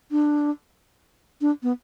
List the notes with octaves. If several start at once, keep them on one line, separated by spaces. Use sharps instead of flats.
D4
D4
B3